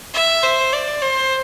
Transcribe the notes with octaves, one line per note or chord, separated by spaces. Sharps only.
E5
C5
D5
C5